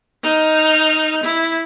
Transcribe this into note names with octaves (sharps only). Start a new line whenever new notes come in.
D#4 F6 G6
E4